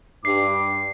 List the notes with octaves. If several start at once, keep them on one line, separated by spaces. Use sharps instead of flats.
G2 D6 C7